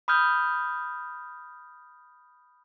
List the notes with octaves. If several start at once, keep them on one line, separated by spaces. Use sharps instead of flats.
B5 D#6 F6 G6